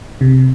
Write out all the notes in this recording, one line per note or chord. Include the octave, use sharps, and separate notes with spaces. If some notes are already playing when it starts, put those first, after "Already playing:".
C3